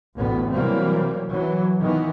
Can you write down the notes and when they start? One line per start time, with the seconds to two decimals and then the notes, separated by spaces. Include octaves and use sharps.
0.16 A1 D2 A2 B3
0.52 C3 E3 F#3 G3 A#3 C4
1.29 E3 F#3
1.78 D#3 E3 B3